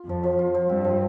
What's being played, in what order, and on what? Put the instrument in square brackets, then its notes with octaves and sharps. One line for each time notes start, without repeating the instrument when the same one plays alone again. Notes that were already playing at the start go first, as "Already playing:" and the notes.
Already playing: [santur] F4
[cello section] F2 [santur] F3
[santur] F3
F4
F3
[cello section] G2 [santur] C4
[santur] F3